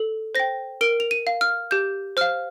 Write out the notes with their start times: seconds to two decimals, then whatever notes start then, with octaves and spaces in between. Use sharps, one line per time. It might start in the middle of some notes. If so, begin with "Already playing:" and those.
Already playing: A4
0.35 C5 G5 A#6
0.81 A#4 D7
1.00 F7
1.11 D#7
1.27 F5
1.41 F6
1.71 G4 G6
2.17 C5 F5 F6